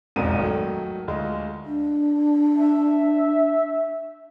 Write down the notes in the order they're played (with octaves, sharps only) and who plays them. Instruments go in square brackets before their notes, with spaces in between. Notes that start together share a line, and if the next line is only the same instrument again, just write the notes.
[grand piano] E1 A#1 F2 G#2 A#4 D#7
D#3 F#3 A3
D2 G#3 F4
[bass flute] D4
[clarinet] E5